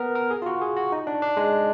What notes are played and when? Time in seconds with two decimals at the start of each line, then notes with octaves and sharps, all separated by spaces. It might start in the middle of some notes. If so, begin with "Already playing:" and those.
Already playing: B3 A#4
0.15 A#4
0.30 G#4
0.42 F4
0.46 F#4
0.62 G#4
0.76 F#4
0.92 D#4
1.07 D4
1.22 D4
1.37 G#3